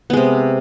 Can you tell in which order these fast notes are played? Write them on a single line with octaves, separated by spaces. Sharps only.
B3 G#3 C3